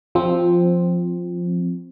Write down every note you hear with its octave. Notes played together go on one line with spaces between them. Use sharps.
F3 C4